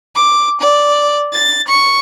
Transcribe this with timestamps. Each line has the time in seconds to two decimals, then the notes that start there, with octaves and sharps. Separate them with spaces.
0.15 D6
0.60 D5
1.32 A6
1.67 C#6